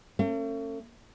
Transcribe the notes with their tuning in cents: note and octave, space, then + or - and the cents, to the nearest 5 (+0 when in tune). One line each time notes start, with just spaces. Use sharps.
A3 +40 C#4 -30